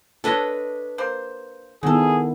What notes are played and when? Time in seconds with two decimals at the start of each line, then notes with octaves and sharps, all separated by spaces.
0.24 D4 A4 B4 C#5 D#5
0.98 A#3 C5
1.83 D#3 B3 E4 F#4 G#4 A4